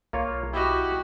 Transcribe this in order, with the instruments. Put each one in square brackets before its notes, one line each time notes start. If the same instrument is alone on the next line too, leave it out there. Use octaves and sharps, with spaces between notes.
[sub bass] B1 [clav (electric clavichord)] A#3 F4 C#5
[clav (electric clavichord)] E4 D#5 [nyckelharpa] F#4 [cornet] G4